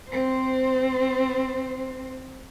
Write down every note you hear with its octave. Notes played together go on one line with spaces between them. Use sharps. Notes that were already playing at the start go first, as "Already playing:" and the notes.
C4 C5